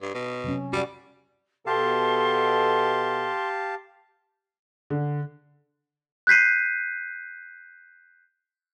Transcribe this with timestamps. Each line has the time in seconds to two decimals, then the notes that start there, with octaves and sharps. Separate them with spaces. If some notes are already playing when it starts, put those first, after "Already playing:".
0.02 G2
0.15 B2
0.44 C3 F#3 C#4
0.73 G3 F#4 D5
1.67 B2 G4 A4 F5 A5 C6
4.90 D3
6.27 F#6 G6 B6 C7 D#7